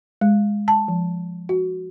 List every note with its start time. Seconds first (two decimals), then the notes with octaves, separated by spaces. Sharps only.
0.21 G#3
0.68 A5
0.88 F3
1.49 F#4